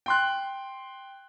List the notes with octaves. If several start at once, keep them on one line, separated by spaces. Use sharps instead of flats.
G5 C6 F#6